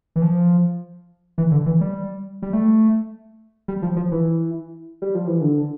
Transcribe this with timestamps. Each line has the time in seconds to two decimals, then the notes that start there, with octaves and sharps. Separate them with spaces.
0.16 E3
0.22 F3
1.38 E3
1.51 D3
1.66 E3
1.81 G3
2.42 G3
2.53 A3
3.68 G3
3.82 F3
3.96 F3
4.12 E3
5.02 G3
5.15 F3
5.27 E3
5.41 D3